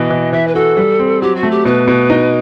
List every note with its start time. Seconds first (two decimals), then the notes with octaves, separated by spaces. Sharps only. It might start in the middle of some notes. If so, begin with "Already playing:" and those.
Already playing: B2 E3 D#5
0.10 E3
0.33 E3 E5
0.48 B4
0.55 F#4 A4
0.77 G3
0.99 C4
1.22 F#3 G4
1.36 F#4
1.43 A3
1.51 G4
1.65 B2 B4
1.87 B2
2.10 D#4